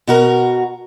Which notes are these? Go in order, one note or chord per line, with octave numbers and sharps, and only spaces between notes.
B2 F#4 A#4